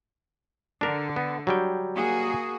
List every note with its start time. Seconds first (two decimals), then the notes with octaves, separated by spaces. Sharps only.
0.81 D3 D4 A#4
1.16 B3
1.47 F#3 G3 G5
1.96 A#3 F#4 G#4